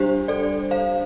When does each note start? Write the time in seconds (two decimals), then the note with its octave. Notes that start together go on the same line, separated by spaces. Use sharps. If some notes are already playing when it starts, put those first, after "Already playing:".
Already playing: G3 D4 G4 C5
0.28 A4 D5
0.71 C5 F5